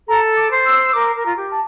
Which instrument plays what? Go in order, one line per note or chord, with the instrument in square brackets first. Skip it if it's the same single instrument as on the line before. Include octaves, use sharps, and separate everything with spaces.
[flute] A4 [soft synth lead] A#5
[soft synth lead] D6
[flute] C5
[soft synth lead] E6
E6
[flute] A#4 [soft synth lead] D6
[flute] A#4
[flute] F4 [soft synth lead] A#5
[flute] G4
[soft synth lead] A5